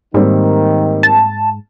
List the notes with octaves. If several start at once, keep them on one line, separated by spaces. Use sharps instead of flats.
G#2 D#3 G3 A#3 C4
A5